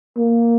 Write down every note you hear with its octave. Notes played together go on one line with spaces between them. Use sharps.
A#3